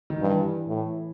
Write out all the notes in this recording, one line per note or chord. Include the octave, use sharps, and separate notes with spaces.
D#3
G2 E3
A2